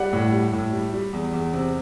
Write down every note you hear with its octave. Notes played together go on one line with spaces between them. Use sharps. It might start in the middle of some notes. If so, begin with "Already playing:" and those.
Already playing: G3 D5 F#5
A2
G3
A2
G3
G3
E2
E2
C3